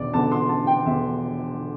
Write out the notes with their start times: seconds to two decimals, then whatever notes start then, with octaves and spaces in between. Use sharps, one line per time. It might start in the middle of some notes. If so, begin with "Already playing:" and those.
Already playing: E1 E2 D3 D5
0.13 E1 E2 D3 A5
0.32 C6
0.49 A5
0.67 G5
0.86 E1 E2 D3 E5
1.57 D3